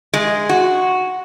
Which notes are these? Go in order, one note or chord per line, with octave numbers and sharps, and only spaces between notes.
G#3
F#4